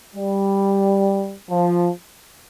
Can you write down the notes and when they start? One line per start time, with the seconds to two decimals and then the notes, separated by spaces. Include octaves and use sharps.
0.15 G3
1.49 F3